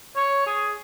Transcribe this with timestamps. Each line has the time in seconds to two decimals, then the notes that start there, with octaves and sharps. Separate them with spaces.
0.16 C#5
0.47 G#4